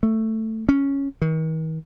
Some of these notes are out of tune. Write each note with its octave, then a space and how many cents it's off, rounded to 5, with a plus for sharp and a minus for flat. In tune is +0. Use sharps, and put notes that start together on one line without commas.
A3 +10
C#4 +0
D#3 +40